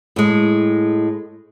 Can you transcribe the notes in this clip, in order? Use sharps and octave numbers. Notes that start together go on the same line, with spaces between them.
A2 G#3